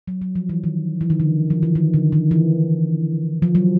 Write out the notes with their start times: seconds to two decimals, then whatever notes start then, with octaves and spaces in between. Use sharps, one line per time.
0.08 F#3
0.22 F#3
0.35 F3
0.49 E3
0.64 D#3
1.01 E3
1.10 D#3
1.20 D3
1.50 F3
1.63 E3
1.75 D#3
1.94 D3
2.12 D#3
2.31 E3
3.42 F3
3.55 F#3